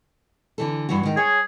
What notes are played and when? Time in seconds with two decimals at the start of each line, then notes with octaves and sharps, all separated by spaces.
0.58 D3 E3 A4
0.89 G2 E3 F#4
1.03 G#2 D#3
1.17 G#4 C#5